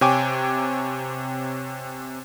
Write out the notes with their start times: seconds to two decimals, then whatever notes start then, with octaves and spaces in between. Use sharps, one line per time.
0.01 C3 C#5 G5 G#5 D6